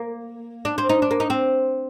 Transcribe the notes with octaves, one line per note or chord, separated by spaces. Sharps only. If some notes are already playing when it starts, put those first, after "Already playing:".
Already playing: A#3
D4
C4
D#4
D4
A#3
D#4
C4